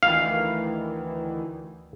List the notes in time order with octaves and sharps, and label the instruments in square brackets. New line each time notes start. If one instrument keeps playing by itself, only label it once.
[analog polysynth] D2 D#3 E3 [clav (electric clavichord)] F5